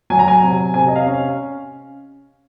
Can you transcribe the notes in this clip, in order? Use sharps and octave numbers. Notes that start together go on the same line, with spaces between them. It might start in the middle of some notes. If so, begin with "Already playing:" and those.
F#3 G#5
A#5
G#5
C3
C3 G#5
D#5
F5
C#4